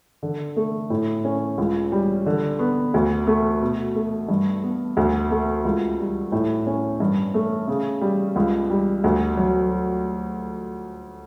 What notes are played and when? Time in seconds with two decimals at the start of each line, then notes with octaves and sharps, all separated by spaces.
0.23 D3
0.56 A3
0.90 A2
1.25 C#4
1.58 C#2
1.92 G3
2.26 D3
2.59 B3
2.94 D2
3.27 A3
3.62 B2
3.95 A3
4.29 G2
4.63 B3
4.97 D2
5.31 A3
5.65 C#2
5.99 G3
6.32 A2
6.67 C#4
7.00 G2
7.34 A3
7.68 C#3
8.01 G3
8.36 C#2
8.70 G3
9.04 D2
9.37 F#3